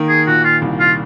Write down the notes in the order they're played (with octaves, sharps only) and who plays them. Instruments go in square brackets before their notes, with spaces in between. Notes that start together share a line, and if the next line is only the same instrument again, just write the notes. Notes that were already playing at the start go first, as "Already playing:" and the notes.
Already playing: [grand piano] D#3 A#3
[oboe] G#4
[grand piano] A#2 [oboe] F#4
[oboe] F4
[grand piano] C2
[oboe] F4